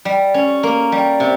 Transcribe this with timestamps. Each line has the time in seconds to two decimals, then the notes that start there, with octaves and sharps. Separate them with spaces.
0.05 G3
0.34 C#4
0.63 A#3
0.92 G3
1.20 C3